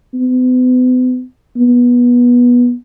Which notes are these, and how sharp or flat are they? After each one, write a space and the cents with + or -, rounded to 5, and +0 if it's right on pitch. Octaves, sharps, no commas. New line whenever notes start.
B3 +40
B3 -20